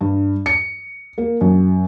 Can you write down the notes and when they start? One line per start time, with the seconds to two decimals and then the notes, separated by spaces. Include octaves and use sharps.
0.01 G2
0.46 C#7
1.18 A#3
1.41 F#2